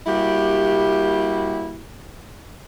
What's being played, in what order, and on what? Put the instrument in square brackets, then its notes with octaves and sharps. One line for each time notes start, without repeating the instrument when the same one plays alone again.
[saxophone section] G3 A#3 E4 F#4 G4